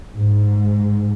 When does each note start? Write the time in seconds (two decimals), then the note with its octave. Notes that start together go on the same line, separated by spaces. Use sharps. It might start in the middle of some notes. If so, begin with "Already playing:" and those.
0.16 G#2